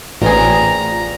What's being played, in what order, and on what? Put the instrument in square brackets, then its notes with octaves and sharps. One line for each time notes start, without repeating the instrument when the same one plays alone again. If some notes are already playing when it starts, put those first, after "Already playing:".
[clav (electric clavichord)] A1 [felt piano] A#2 B4 [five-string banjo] C4 F4 G#4 [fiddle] A#5